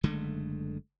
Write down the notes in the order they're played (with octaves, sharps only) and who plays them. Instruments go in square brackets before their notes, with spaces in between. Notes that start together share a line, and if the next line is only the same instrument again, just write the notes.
[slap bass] F#1 D3 G#3 A3